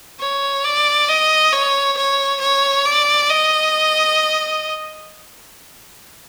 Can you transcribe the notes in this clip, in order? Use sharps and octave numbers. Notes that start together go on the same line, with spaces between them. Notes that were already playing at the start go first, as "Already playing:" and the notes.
C#5
D5
D#5
C#5
C#5
C#5
D5
D#5